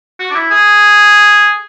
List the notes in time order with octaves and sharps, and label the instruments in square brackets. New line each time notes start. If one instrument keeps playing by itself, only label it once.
[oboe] F#4
D4
E4
G#4